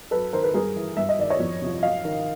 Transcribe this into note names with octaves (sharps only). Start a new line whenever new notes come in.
F#2 A4 B4
D#3 A#4 C5
A4 B4
G2 G#4 A#4
E3
G2 E5
D#5
D#3 D5
C#5 D#5
F2
C3 F3
F#2 D#5 F5
D#3